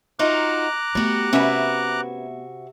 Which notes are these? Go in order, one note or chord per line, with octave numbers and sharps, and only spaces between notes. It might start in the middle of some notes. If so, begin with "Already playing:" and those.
D#4 F4 F#4 A#5 D6 F#6
G3 A3 B3 F#4
C3 C#4 F#4 B4 E5